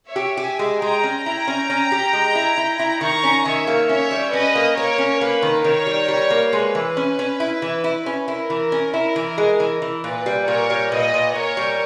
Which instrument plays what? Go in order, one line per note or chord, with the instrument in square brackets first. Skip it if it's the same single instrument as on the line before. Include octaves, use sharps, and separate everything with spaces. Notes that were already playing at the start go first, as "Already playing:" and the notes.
[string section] C#5 E5
[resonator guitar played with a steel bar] G4
[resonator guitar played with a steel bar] G4 [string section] E5 G#5
[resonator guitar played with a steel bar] G#3
[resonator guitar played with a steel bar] G#3 [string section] G5 A#5
[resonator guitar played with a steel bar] C#4
[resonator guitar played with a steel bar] E4 [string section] G5 A#5
[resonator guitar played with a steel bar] C#4
C#4
G4
G#3
E4
E4
E4
[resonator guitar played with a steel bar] D#3 [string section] A#5 C#6
[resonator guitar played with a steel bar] C#4
[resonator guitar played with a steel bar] D#3 [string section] C#5 E5
[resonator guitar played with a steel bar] A#3
[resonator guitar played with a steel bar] C#4 [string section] C#5 E5
[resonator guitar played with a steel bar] G3
[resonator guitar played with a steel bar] C#4 [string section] B4 D#5
[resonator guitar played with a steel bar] A#3
[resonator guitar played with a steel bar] A#3 [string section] A#4 C#5
[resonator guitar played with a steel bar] C#4
[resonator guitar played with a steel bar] A#3 [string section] B4
[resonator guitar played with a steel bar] D#3
[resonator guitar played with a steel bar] D#3 [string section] A#4 C#5
[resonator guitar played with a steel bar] G3
G3
A#3
[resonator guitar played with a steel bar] G#3 [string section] B4
[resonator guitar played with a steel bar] E3
C#4
C#4
E4
E3
E4
C#4
[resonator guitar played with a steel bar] E4 [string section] A#4
[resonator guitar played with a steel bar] E3
C#4
E4
E3
G#3
E3
E3
[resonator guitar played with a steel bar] A#2 [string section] B4
[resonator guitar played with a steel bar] G3
[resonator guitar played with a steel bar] A#2 [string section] A#4 C#5
[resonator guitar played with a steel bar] G3
[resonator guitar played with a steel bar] A#2 [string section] B4 D#5
[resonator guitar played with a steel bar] A#2
[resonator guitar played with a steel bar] A#2 [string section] A#4 C#5
[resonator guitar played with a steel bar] G3